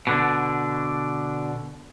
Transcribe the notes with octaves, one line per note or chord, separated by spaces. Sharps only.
B2 D3 D4